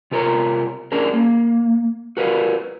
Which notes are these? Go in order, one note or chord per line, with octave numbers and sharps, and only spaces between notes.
C3 F4 A#4 B4 C#5 A#5
C#4 D4 G#4 A#4
A#3
F#4 A#4 B4 E5 F5